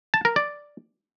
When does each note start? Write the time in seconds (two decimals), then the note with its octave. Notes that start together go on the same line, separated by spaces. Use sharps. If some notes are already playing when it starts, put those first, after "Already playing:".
0.14 A5
0.25 A#4
0.36 D5